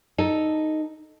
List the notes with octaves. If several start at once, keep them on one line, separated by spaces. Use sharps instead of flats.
D#4 A4